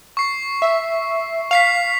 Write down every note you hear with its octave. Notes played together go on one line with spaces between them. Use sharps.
C#6 C7
E5
F5 B6 C7 F7